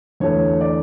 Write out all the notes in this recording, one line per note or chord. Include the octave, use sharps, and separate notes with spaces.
E2 D3 A3 C#5
D5